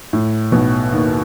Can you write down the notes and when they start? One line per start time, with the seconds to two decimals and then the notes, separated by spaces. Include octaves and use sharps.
0.13 A2
0.52 B1 B2
0.92 D#2 D#3